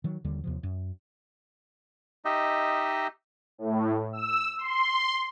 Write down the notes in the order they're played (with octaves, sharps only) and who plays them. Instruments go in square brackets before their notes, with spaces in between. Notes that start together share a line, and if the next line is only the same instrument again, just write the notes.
[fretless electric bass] D#3 F#3
D#2 D3 G3
D#2 C3 F3
F#2
[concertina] D#4 G4 D#5 E5
[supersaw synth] A2
E6
C6